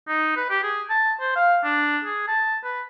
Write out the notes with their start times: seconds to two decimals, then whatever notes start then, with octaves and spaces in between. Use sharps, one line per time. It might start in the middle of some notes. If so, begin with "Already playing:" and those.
0.08 D#4
0.37 B4
0.50 G4
0.63 G#4
0.90 A5
1.21 C5
1.36 F5
1.64 D4
2.05 G#4
2.28 A5
2.64 B4